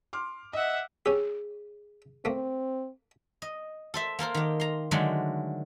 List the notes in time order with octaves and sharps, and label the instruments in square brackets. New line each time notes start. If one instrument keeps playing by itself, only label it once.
[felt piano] C6 D6 F6
[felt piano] D#5 [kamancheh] E5 F#5
[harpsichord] C#4 G4 [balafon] G#4
[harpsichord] A3 A#3 [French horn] C4
[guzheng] D#5
A4 C5 E5
A#3 A4 A#4 C5
D#3 G4
A#5 C6
D3 D#3 F#3 G#3 A3 D4